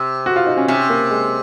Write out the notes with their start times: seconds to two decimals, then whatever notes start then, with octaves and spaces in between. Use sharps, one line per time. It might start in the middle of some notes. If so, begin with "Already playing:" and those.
Already playing: C3
0.26 F#4
0.36 F4
0.46 D#4
0.57 C#4
0.68 C3 C#4
0.90 A#3
1.10 G#3